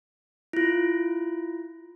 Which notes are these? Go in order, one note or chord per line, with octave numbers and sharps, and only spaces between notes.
E4 F4